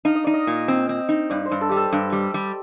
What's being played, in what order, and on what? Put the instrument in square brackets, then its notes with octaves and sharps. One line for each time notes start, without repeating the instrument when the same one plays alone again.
[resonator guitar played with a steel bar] D#4 [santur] F5
[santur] D#5
[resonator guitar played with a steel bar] D#4 [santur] D5
[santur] D#5
[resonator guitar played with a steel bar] A#2
C4
C4
D#4
[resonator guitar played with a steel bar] G2 [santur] D5
[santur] C5
[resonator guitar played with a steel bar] G2
[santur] A4
[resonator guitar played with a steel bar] G3 [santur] G4
[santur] A4
[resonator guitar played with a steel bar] G2
G3
G3